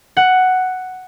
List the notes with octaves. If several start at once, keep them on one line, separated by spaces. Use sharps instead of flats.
F#5